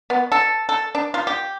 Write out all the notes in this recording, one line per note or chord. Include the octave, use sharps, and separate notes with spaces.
B3
A4
A4
D4
F4
G4